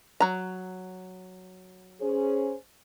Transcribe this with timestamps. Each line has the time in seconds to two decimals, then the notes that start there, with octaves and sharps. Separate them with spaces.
0.20 F#3 A#5
2.01 C#4 G#4 C5